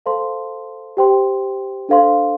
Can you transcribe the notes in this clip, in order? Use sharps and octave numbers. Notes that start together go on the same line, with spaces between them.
A4 C5 F5 A5 C6
G4 C5 G5 C6
D4 A4 C5 F5 C6